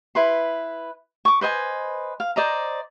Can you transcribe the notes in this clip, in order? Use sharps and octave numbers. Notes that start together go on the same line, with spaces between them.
E4 B4 C6
C#6 D6
B4 C5 D#5 G#5
F5
C5 D5 D#5 A#5